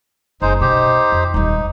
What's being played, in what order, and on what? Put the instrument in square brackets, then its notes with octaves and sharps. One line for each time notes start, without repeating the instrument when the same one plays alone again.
[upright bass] F#1 [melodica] G#3 D#4 C5
[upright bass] B2 [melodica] D#4 G4 C5
[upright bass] F2
[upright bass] D#1 G3 [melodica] D#4